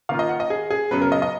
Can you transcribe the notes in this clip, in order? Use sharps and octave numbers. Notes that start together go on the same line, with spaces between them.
D#3 A#3 F4 F5
D#5
F#5
D#5
G#4
G#4
F#2 C#3 F#3 B3 B4
A#4
D#5
D#5